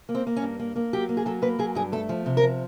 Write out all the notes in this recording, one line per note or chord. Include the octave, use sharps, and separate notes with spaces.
A#3
C4
A#3
C#4
G2
A#3
A#3
F#3 G4
A#3
G#4
F#3 A4
A#3 B4
F#3 G#4
G2 G#4
A3 A4
F3
C3
A#4
F3